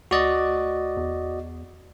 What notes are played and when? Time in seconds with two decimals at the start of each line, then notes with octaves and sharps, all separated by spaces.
0.11 D2 F#4 D5 D#5
0.97 E2